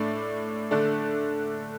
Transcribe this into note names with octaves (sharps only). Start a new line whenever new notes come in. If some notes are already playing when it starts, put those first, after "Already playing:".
Already playing: A2 A3 D4 D5
D3 A3 D4